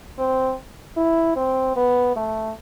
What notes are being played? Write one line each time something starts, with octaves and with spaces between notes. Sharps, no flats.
C4
E4
C4
B3
A3